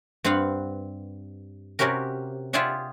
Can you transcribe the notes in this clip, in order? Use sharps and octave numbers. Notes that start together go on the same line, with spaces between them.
G2 C4 B4 F5 F#5
C3 C#4 F#4 G4 A#4
F4 G4 G#4 D5 E5 F#5